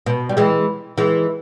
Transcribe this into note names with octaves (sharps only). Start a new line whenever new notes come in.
B2
G3
E3 G#3
E3 G#3